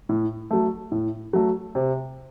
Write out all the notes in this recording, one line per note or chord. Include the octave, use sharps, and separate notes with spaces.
A2
F#3 A3
A2
F#3 A3
C3